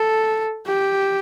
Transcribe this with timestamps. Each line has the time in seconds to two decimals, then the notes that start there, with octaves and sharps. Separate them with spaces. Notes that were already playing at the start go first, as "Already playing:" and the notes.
Already playing: A4
0.67 G4